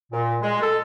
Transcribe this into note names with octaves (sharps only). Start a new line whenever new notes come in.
A#2
G#3
A4